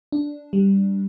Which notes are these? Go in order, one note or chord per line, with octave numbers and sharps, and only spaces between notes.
D4
G3